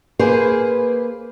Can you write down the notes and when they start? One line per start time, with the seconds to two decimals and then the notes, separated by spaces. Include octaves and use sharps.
0.19 A#3 G#4 B4 C5